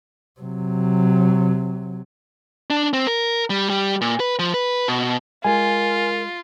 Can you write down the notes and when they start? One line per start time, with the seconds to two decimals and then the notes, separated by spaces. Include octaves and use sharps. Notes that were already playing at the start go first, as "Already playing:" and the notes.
0.41 C3 F#3
2.70 D4
2.93 C4
3.07 A#4
3.50 G3
3.69 G3
4.01 A#2
4.20 B4
4.39 F3
4.54 B4
4.88 B2
5.44 G#3 F4 A#4 G#5